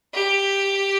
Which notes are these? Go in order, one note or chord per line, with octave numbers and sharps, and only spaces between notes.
G4